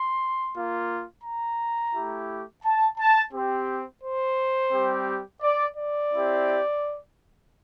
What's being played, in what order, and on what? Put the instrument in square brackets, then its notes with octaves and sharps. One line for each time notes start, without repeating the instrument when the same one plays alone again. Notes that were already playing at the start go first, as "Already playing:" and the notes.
Already playing: [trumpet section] C6
A#3 F4
A#5
A3 E4 G4
A5
A5
C4 G4
C5
G3 C4 G4
D5
D5
C4 E4 G4